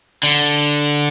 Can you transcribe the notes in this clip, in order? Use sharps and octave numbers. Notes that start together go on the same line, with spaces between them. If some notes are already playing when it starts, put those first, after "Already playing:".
D3